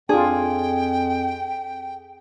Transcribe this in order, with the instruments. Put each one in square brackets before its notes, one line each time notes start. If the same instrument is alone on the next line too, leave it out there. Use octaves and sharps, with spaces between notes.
[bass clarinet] F2 [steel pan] D4 F4 [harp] G#4 [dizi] G5